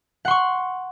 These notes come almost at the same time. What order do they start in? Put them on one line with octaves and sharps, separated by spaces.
F#5 C6 C#6